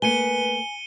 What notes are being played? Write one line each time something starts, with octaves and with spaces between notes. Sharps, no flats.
A3 A#3 B4 G#5 C#7 D#7 G7